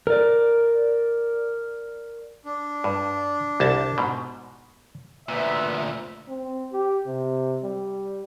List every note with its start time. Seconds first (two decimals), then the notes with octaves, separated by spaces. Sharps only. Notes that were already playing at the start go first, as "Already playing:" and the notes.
0.07 A#4 D5
2.45 D4
2.84 G2
3.60 C2 A5
3.98 G#2 B2
5.29 D2 A#2 B3 E5
6.28 C4
6.73 G4
7.07 C3
7.63 G3